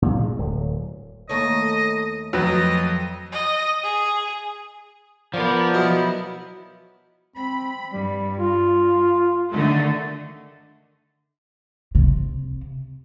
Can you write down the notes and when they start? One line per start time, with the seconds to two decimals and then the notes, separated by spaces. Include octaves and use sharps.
0.02 A#2
0.19 G#3
0.39 D1
1.29 D#2 A3 C#5 D#5
2.33 F2 F#3 B4 D#5
3.32 D#5
3.83 G#4
5.34 F3 B3 A#4 D5
5.74 B2 F#3 B3 E4 D#5
7.37 C4 B5
7.93 G2 G3
8.37 F4
9.53 D3 D#3 A3
11.95 C3